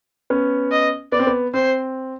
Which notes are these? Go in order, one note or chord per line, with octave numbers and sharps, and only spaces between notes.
B3 C#4
D#5
B3 D5
C4
B3
C4 C5